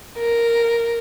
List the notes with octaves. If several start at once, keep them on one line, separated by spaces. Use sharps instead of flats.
A#4